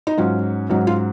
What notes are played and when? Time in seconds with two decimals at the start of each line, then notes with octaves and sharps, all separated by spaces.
0.07 D#4
0.18 G#2 F#3 C#4 F4
0.70 G#2 F#3 C#4 D#4
0.87 F4